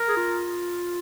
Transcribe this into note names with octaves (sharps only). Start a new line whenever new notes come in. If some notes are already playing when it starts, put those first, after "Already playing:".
Already playing: A#4
G#4
F4